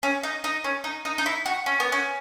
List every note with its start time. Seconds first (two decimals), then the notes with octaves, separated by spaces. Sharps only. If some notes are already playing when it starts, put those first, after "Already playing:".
0.03 C#4
0.23 D#4
0.44 D#4
0.64 C#4
0.84 D#4
1.05 D#4
1.18 D#4
1.26 E4
1.46 F#4
1.66 C#4
1.80 B3
1.92 C#4